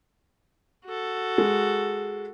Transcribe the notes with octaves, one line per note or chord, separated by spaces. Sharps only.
F#4 A4
G#3